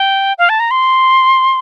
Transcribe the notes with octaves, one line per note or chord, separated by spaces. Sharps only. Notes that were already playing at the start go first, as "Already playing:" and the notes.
Already playing: G5
F5
A5
A#5
C6